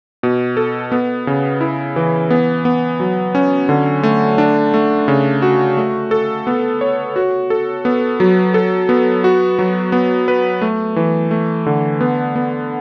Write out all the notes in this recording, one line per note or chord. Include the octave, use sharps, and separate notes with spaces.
B2
A4
B3
C#3
E4
E3
B3
B3
F#3
C#4
D3
A3
D4
A3
C#3
F#4
A3
A4
B3
C#5
F#4
A4
B3
F#3
A4
B3
F#4
F#3
B3
B4
A3
E3
A3
D3
B3
B3